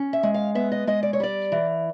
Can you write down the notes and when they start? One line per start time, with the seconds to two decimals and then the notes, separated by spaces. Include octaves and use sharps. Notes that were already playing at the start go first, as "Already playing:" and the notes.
Already playing: C#4
0.13 E5
0.23 G#3
0.34 F5
0.55 B3 E5
0.72 D#5
0.87 G#3 D#5
1.03 D5
1.13 C#5
1.20 G3 D5
1.52 E3